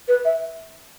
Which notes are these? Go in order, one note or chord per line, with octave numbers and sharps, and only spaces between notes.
B4
E5